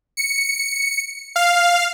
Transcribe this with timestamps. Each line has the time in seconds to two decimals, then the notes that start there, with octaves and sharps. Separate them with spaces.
0.17 C#7
1.36 F5